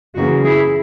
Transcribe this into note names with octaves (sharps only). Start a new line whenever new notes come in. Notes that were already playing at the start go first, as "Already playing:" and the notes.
F#2 C#3 E3 A#3 D#4 F#4
E4 G#4